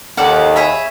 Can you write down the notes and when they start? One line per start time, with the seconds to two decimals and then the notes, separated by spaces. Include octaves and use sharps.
0.17 D#2 C#4 A4 D5 F#5
0.56 G#4 C#5 E5 B5